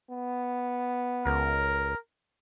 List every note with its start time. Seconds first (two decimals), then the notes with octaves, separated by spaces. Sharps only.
0.11 B3
1.26 C#2 A#4